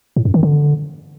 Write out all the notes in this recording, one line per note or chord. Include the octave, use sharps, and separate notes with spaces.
A2
F#2
D#3
D3